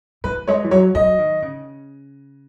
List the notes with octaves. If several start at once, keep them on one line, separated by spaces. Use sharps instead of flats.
E3 B4
G#3 C#5
E3
F#3 C#5
F#3 D#5
D#3
C#3